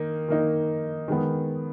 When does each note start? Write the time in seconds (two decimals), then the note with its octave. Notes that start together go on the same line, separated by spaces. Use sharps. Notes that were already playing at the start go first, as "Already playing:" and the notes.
Already playing: D#3 A#3 D#4
0.28 D#3 A#3 D#4
1.08 D#3 G#3 B3